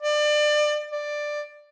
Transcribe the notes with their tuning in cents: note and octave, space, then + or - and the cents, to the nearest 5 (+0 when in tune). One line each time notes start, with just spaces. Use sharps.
D5 +30
D5 +10